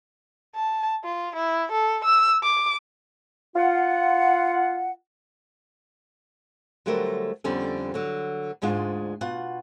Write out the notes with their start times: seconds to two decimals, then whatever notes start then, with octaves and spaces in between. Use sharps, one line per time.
0.56 A5
1.04 F4
1.36 E4
1.72 A4
2.05 E6
2.44 D6
3.56 F4 F#5
6.86 D3 F#3 G3 A3 A#4 C5
7.44 F2 D3 G3 B3 C#4
7.94 D3 F#3
8.62 D2 G#2 G#3 D4 F4
9.21 B2 F4 F#5